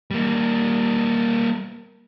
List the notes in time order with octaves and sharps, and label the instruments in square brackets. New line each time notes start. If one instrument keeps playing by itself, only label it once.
[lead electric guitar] G3 A#3